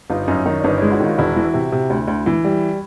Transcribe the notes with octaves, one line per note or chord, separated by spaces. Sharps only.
G1 D#4 F4
F#2 C#4 D#4
D#3 C#4 D#4
D4
G1 C#4 D#4
G#3 D4 E4
E4 F#4
D#3 D#4 F4
E1 E4 F#4
E3
C3
C3
D2
D2
E3
G3